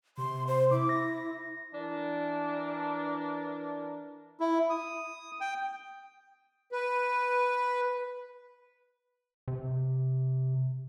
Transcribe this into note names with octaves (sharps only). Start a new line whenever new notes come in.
C3 C6
C5
E4 D6
A#6
E3 D4 A#4
E4
D#6
G5
B4
C3